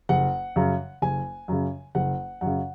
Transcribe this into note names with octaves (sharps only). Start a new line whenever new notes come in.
F#1 F#5
F#2 C#3
F#1 G#5
F#2 C#3
F#1 F#5
F#2 C#3 F#5